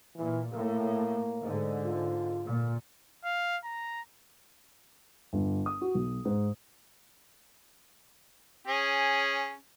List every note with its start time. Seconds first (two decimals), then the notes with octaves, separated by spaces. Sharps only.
0.16 A#2 E3
0.51 A2 A#3
1.42 G#2 D3
1.85 F4
2.45 A#2
3.25 F5
3.65 A#5
5.33 G1
5.66 D#6
5.81 F#4
5.95 B1
6.25 G#2
8.67 C#4 G#4